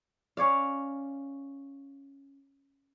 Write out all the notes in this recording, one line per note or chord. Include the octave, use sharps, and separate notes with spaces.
C#4 C#5 D5 F5